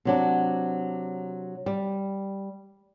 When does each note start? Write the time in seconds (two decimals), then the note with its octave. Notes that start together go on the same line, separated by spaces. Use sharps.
0.05 C3 F#3 D4
1.66 G3